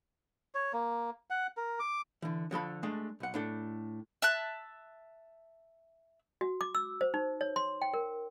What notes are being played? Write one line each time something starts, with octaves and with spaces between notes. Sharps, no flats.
C#5
A#3
F#5
A#4
D6
D3 E3
D3 F3 A4 B5
G#3 A3 D4
B1 F#5
A2 D4 A4
E5 A5 F#6
F#4
D6
E6
C5
D#4
C#5
C6
G5
A#4